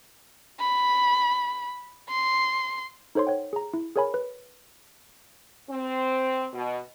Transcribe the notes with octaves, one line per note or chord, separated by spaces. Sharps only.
B5
C6
D#4 A4 C5 C#5 C6
C#5 F#5 G5
G#4 A#5
E4
G#4 A#4 C#5 G#5 B5
B4
C4
B2